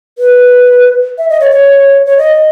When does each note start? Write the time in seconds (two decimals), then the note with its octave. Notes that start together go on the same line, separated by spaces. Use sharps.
0.19 B4
1.18 E5
1.29 D#5
1.40 C#5
1.51 C#5
2.06 C#5
2.18 D#5